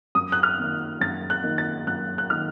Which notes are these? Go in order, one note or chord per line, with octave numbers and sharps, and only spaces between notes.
F#2 D#6
F#6
F6
D#3 A#3 D#4
F#2 A6
F#6
D#3 A#3 D#4
A6
F#2 F#6
F#6
D#3 A#3 D#4 F6